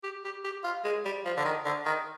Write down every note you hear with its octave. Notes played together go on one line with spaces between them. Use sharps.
G4
G4
G4
F4
G#3
G3
F3
D3
D#3
D3
D#3